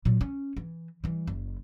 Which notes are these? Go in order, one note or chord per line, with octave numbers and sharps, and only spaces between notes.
A#2 F#3
C#4
E3
E3 G3
F#1